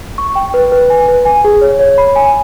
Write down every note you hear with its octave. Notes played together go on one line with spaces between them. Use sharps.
C#6
G5
B4
B4
G#5
B4
G#5
G#4
C#5
C#5
B5
G#5